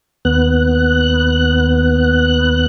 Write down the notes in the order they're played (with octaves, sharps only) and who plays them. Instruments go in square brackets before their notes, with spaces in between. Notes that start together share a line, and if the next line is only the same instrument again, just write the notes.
[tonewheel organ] D#2 B3 F#6